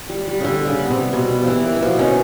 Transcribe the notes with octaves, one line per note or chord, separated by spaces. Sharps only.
G3
G3
C#3
D3 G3
G3
C#3
B3
C#3
C3
G3
B2 G3
G3
F3
E3 A#3
A#3
E3
B2 F3
D#3 C#4